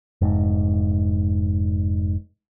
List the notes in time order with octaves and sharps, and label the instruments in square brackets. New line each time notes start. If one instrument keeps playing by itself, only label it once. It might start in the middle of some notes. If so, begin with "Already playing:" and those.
[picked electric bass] F1 G#2